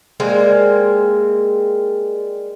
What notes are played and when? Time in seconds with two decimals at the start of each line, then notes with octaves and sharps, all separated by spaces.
0.20 G3 G#3 A#3 C4